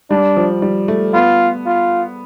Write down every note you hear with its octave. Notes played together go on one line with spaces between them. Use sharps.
G3 D4
F3
G3
A3
B3 F4
F4